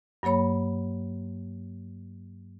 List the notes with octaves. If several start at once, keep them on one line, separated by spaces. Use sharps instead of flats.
G2 F#3 A#3 C#5 B5